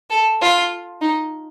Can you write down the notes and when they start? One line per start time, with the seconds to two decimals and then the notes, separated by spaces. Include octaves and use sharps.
0.10 A4
0.41 F4
1.01 D#4